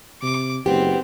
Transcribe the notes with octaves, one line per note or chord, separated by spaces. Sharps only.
C3 D6
F#1 B3 C4 G4